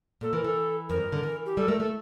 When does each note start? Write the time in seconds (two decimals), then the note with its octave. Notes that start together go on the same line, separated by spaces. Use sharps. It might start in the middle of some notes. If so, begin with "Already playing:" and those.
0.21 A#2 A4
0.33 E3 A#4
0.44 E3 A4
0.89 F2 A#4
1.01 G2
1.12 D3
1.23 E3
1.46 G4
1.57 G3 A4
1.68 A3 A#4
1.79 A3 A4